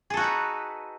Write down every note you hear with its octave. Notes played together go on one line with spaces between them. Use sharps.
D#4 F#4 G#4 A4 B4